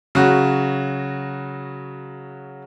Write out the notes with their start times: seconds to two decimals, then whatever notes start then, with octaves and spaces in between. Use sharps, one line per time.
0.15 C#3 F#3 F#4